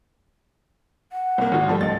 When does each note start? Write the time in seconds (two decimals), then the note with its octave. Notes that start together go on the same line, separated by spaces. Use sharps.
1.12 F#5
1.38 C2 A#3
1.52 G#1 F4 F#4
1.68 F3 G3 A3 A5
1.81 C#2 D#5 A6